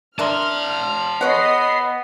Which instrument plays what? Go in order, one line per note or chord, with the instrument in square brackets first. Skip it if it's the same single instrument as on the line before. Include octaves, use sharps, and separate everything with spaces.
[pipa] D4 A#4 E5 [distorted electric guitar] A5 C6 [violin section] F6
[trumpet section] B3 [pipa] G#4 C#5 F#5 [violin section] D#5 C7